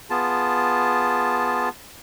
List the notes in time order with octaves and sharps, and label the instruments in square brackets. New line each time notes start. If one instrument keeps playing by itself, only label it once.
[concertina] B3 F4 G#4 A5